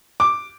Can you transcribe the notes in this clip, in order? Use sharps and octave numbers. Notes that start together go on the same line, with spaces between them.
D6